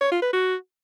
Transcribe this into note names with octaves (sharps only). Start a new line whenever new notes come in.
C#5
F4
B4
F#4